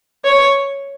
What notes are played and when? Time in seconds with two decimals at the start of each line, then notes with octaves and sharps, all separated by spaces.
0.24 C#5